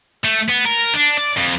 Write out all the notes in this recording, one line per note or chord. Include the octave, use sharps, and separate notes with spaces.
A3
B3
A#4
D4
D5
F2